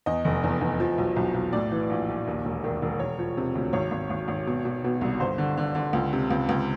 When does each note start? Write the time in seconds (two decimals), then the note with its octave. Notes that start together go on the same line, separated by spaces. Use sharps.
0.06 E2 D#5
0.25 F1
0.44 E2
0.61 E2
0.80 F3
0.98 B1
1.16 B1
1.34 B1
1.53 A2 D5
1.71 E3
1.90 A#1
2.09 A#1
2.27 D#2
2.45 E1
2.64 D#3
2.82 E1
2.99 E1 C#5
3.19 F3
3.37 C3
3.55 D2
3.73 G#1 C#5
3.91 G#1
4.10 G#1
4.28 G#1
4.47 B2
4.65 B2
4.84 B2
5.01 C2
5.20 G1 C5
5.38 D3
5.57 D3
5.75 D3
5.93 C#2
6.13 C3
6.31 C#2
6.49 C#2